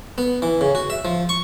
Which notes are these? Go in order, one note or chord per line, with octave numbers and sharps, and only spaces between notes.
B3
E3
C#3
F#4
E5
F3
C#6